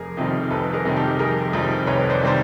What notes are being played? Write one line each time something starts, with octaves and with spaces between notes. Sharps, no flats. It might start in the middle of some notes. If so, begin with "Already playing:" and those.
Already playing: F1 G#4 A#4
F2 C3 D#3 G3
F1 A4 B4
G#4 A#4
F2 C3 D#3 G3
G4 A4
F1 G#4 A#4
F2 C3 D#3 G3
F1 B4 C#5
C5 D5
C3 D#3 G3 C5